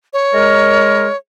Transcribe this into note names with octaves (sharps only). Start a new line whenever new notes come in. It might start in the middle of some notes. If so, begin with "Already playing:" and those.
C#5
G#3 A#4